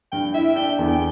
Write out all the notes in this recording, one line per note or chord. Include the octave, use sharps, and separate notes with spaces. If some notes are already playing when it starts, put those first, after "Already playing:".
G2 G5
E4 E5
D4 G5
E2
G5